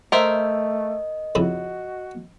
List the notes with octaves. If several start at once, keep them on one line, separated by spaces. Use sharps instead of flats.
A3 A#4 C5 D#5 E5
F2 C#3 E4 F#4